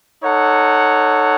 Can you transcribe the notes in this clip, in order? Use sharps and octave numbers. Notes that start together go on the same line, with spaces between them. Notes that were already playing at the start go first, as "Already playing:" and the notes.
D#4 A4 C#5 F#5